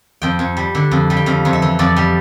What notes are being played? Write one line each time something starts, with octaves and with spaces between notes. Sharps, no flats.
F2 G5
F2
G3
D3
F2
G3
G5
F2 F5
F2
E5
E3
F2 D5
G3